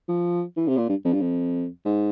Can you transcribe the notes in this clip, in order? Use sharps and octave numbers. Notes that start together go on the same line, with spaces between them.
F3
E3
C3
A#2
G2
F2
G2
F2
G#2